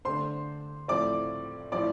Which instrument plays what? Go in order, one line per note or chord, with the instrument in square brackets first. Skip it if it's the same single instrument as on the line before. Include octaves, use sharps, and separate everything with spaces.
[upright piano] D3 A3 D4 C5 C6
A2 F3 A3 C4 D5 D6
A2 F3 C4 D5 D6